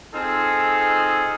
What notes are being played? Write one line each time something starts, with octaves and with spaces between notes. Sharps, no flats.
C4 D#4 F4 G#4 A4